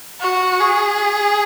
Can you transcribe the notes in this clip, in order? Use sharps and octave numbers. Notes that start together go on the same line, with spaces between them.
F#4
G#4